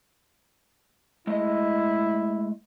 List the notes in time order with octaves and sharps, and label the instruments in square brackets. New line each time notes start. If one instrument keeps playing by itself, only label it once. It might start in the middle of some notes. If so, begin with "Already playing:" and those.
[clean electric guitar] G#3 A3 D#5 [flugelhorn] E4